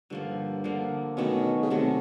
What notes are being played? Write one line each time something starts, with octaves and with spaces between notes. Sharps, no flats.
G2 D3 F3 A#3
D3 F3 A#3
B2 D#3 F#3 A3 C#4
C#3
C3 D#3 F#3 A3 C#4